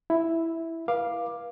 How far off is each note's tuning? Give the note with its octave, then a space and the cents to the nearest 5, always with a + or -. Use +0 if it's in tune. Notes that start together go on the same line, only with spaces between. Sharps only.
E4 +0 E5 -10
B4 -35 F5 +0 D6 +10